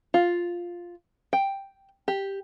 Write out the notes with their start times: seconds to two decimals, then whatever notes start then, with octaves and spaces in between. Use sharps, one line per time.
0.14 F4
1.33 G5
2.08 G4